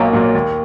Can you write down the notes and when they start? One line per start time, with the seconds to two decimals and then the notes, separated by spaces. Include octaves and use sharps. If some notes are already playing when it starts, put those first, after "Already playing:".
Already playing: B1 A#2 F#3 A#3
0.13 A#2 F#3
0.35 D#2